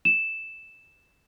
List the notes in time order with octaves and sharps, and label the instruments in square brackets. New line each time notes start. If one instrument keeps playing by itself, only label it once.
[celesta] E7